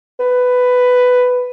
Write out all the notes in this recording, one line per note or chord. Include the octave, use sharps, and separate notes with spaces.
B4